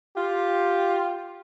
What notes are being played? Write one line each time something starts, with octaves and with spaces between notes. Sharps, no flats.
F4 G4